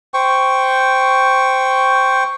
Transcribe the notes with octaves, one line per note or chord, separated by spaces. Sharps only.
C5 G5 C#6